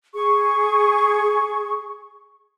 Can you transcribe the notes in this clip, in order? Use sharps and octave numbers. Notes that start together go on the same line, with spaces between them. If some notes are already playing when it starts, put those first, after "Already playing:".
G#4 C#6